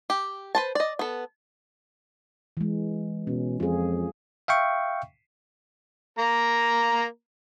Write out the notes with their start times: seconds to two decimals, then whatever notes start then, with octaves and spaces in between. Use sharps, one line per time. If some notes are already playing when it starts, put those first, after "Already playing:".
0.10 G4
0.55 B4 C5 A5
0.75 D5 D#5
0.99 B3 A4
2.57 E3 G#3
3.27 B2 C#4
3.60 F2 F4 G#4
4.48 E5 F5 G5 C#6
6.19 A#3 A#5